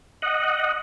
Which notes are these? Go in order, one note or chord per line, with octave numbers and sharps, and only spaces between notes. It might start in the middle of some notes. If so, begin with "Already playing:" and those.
D#5 F#5